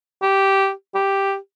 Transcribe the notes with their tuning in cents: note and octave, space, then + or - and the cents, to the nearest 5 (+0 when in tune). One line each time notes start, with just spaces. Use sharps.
G4 -10
G4 +0